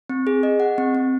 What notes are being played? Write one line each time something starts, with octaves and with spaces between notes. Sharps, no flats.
C4
G#4
D#5
F#5
C4
C4